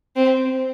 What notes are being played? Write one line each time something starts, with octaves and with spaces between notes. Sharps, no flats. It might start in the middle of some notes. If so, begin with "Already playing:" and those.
C4